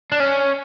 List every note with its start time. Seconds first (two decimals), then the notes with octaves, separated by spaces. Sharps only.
0.12 D4
0.20 C#4